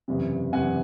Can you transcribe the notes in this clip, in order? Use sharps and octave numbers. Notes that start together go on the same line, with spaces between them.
F#1 E2 C3
F#1 E2 C3 F#5 G#5